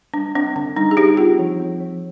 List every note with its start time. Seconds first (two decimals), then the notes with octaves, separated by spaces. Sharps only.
0.14 G3 D4
0.35 C4 D4
0.56 D3 D4
0.76 G3 D#4
0.91 G#4
0.97 D4 D#4 G4
1.17 C4 F4 G#4
1.39 F3
1.60 C4
1.80 F3